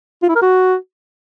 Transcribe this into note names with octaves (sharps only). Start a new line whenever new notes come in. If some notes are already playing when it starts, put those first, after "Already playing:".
F4
E4
A#4
F#4